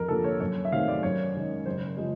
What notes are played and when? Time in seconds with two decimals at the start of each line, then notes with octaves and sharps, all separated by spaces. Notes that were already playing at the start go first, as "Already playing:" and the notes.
Already playing: F2 A#4
0.08 D3 F3 A#3 A4
0.24 C#5
0.40 F#2 C#5
0.65 E5
0.72 D#3 F#3 A3 C4 F5
0.88 D5
1.03 F#2 C#5
1.34 D#3 G#3 C#4
1.66 F#1 C5
1.97 C#3 F3 G#3